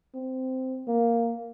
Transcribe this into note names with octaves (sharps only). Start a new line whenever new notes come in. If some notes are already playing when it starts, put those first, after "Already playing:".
C4
A#3